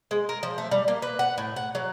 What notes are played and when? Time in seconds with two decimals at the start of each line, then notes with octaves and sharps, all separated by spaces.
0.11 G#3
0.29 A#4
0.43 F3
0.58 A3
0.71 G3
0.88 A#3
1.02 B4
1.19 F#5
1.38 A2
1.56 F#5
1.75 F#3